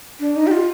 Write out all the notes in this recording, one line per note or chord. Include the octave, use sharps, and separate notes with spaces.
D4
D#4
G4
F4